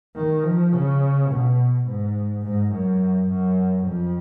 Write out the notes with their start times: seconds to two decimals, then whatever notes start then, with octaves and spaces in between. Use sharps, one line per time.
0.15 D#3
0.44 F3
0.73 C#3
1.30 B2
1.86 G#2
2.42 G#2
2.72 F#2
3.29 F#2
3.85 F2